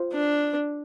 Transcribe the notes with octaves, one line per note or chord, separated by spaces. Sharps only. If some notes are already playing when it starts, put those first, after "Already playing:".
Already playing: F4 C5
D4